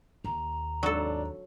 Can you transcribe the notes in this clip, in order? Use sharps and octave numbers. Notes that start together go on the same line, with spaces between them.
D#2 A#5
G#1 F#3 D4 A4